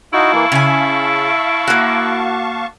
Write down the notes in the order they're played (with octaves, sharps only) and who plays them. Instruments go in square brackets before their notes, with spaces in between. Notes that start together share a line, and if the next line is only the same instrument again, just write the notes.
[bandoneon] D#4 F#4 [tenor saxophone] E4 [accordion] F5 A5 C#6
[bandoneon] E3 A#3
[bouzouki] C#3 G#5 [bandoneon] E5
[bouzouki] A#3 F#4